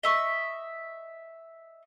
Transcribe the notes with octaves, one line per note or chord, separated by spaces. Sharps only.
D#5 E5 C#6